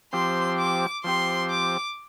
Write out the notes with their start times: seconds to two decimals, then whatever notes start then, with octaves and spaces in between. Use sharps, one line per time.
0.13 F3 C4 G4 C6
0.59 D6
1.04 F3 C4 G4 C6
1.50 D6